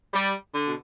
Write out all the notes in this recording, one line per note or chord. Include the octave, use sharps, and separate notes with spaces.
G3
D3
B2